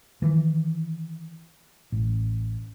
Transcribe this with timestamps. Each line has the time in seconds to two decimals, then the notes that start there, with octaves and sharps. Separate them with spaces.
0.22 D#3 E3
1.92 A1